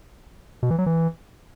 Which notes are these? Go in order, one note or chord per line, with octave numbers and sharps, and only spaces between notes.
B2
E3
F#3
E3